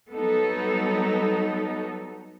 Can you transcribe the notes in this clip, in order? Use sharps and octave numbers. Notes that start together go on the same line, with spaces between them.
F#3 G3 B3 D#4 A4